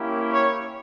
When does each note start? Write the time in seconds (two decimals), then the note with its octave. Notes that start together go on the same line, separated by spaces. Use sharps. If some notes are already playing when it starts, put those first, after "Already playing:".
Already playing: A#3 C#4 E4 G4
0.30 C#5